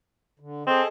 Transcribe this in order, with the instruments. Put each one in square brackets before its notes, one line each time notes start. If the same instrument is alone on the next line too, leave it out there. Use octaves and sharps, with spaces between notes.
[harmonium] D3
[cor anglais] C4 [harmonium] G#4 A4 D#5